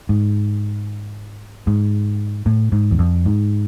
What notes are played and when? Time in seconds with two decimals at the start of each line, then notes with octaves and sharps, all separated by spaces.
0.09 G#2
1.67 G#2
2.46 A2
2.72 G#2
2.91 E2
2.99 F2
3.25 G#2